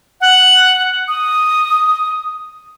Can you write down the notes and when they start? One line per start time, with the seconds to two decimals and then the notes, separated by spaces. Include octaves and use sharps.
0.21 F#5
1.08 D#6